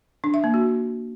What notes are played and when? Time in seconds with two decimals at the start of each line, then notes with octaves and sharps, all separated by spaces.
0.24 D4
0.34 E5
0.44 A#3
0.54 F#4